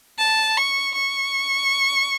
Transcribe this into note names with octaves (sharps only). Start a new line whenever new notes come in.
A5
C#6
C#6